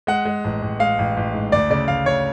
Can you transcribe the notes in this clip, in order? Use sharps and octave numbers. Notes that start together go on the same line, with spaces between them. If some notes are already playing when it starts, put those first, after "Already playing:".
G#3 F#5
G#3
A1
A1
G#3 F5
A1
A1
G#2
D2 D5
C#3 D5
D2 F5
D2 C#5